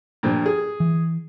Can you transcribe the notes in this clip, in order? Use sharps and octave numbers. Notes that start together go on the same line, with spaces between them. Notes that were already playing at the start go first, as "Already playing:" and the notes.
G2 A#2 F3
G#4
E3